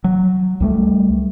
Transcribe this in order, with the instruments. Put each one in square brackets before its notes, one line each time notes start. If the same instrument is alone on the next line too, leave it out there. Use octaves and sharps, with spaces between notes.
[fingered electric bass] F#3
C#2 G3 A3